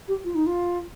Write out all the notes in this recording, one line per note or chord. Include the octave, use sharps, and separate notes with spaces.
G4
F4
D#4
F4